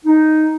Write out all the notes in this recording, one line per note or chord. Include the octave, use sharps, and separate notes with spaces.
D#4